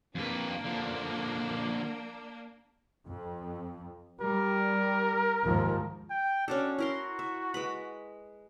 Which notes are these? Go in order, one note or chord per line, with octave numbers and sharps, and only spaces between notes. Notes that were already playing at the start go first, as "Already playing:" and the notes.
F2 A#3 D4 B4
D3 F3
F2
G3 A#4
D#2 G#2 F3
G5
C#4 D4 F#4 A4
E4 F#4 A#4 C6
E5
G#3 B4 B5